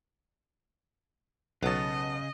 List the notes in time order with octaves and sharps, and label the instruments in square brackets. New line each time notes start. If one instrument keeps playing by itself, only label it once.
[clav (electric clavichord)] B1 F#3 [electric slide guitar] C#3 [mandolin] B3 A5 [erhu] D#5